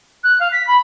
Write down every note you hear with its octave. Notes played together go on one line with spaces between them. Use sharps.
F#6
F5
B6
B5